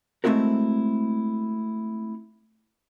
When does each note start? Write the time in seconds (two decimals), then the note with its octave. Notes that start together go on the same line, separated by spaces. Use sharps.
0.24 G#3 A3 C4 E4 F#4 A#4